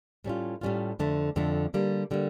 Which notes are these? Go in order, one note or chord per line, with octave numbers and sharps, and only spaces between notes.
A2 G3 C#4 F4
A2 G3 C#4 F4
F2 D3 A3
F2 D3 A3
D3 G3 A#3
D3 G3 A#3